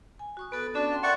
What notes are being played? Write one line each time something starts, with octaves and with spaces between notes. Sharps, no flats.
G#5
F#4 C#6 D#6
B3 A4 B4
C#4 D4 F#4 A4
F5 G5 C6
A#4 D5 E5 F#5 C#6